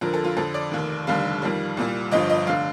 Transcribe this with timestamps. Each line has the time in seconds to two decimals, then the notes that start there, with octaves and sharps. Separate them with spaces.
0.01 F2 D3 F3 A#4
0.13 A4
0.24 F4
0.37 F2 D3 F3 A4
0.54 D5
0.71 F1 D#2 D#3
1.07 F1 D#2 D3 G3 F5
1.42 F2 D#3 G3
1.77 C2 A#2 G3
2.12 G1 G2 F3 D#5
2.30 D#5
2.47 F1 D3 F5